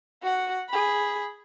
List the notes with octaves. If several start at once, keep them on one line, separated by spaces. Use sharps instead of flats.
F#4 F#5
G#4 B5